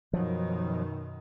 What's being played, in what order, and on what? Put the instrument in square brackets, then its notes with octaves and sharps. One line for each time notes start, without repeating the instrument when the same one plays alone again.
[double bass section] F#2 B2 D#3 [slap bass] F3 F#3